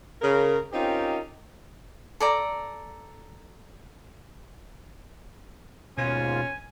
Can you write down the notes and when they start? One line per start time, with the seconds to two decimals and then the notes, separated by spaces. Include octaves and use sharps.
0.22 C#3 A#4
0.73 C4 C#4 D#4 F4 G4 A#4
2.20 A4 D5 A#5
5.98 D#2 G#2 B2 C#4 F4 G#5